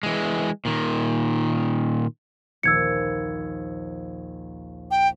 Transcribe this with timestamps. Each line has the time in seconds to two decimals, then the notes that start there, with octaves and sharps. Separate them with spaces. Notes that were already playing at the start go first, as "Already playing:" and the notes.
0.03 E3 G#3
0.65 A#2 D#3
2.63 A#1 D#2 E6 G#6 C#7
4.91 G5